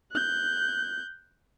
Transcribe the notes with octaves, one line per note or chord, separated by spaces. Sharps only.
F#6 G6